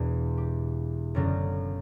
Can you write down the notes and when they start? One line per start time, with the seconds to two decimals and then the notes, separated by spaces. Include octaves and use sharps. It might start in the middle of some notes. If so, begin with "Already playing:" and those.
Already playing: E1 E2 B2 D4
0.37 G4
1.15 F#1 F#2 D3 F#3